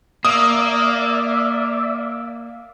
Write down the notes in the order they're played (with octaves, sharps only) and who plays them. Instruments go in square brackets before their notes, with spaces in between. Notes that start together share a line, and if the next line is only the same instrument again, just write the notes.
[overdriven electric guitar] A#3 [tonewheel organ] D5 E5 [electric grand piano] D#6